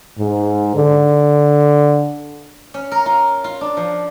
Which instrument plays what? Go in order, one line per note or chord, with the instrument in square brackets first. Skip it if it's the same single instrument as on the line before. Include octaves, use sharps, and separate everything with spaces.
[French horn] G#2
D3
[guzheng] C#4
A#4
F4
F4
D4
F3